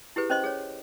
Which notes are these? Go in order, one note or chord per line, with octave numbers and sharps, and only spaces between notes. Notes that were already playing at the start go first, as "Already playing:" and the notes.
E4 G4 G#4 B4
C#4 C5 D#5 C6
G#4 C#5